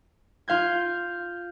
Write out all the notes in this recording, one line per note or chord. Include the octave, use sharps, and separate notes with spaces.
F4 F5 G6 G#6